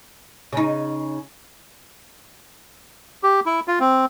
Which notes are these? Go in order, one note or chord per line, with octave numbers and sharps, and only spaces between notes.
C#3 D#4
G4
E4
F4
C4